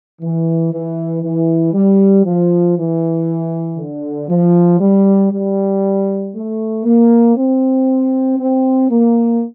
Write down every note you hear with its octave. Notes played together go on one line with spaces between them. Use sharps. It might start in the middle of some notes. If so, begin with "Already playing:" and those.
E3
E3
E3
G3
F3
E3
D3
F3
G3
G3
A3
A#3
C4
C4
A#3